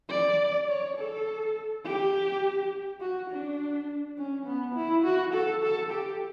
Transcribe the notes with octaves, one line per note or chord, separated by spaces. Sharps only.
D5
C#5
A4
G4
F#4
D4
C#4
B3
E4
F#4
A4
A4
G4